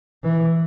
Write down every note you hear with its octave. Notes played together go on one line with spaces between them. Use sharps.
E3